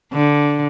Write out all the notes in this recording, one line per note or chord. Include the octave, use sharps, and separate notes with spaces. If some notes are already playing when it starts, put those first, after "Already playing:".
D3